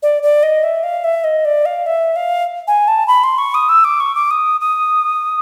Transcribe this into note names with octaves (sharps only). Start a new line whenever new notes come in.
D5
D5
D#5
E5
F5
E5
D#5
D5
F5
E5
F5
G#5
A5
B5
C6
C#6
D#6
E6
D6
C#6
D6
D#6
D#6